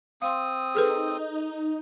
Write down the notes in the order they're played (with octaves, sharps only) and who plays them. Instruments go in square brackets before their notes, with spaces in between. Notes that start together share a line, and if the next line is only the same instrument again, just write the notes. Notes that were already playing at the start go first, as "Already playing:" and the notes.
[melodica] C4 D#6 [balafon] F5 C6
[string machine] D#4 [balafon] G#4 A4 B4